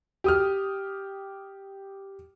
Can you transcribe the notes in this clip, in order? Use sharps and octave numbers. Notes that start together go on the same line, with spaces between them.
G4 D#6 F6